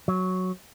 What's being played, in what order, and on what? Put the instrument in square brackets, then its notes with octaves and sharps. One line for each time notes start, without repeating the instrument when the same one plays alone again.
[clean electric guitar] F#3